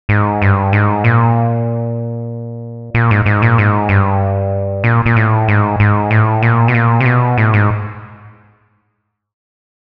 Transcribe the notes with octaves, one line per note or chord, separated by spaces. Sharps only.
G#2
G2
G#2
A#2
A#2
G#2
G#2
A#2
G#2
G2
A#2
A#2
A2
G#2
G#2
A2
A#2
B2
A#2
C3
B2
A2
G#2